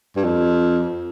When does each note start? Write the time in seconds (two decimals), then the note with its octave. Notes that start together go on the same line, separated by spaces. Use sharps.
0.16 G2
0.24 F2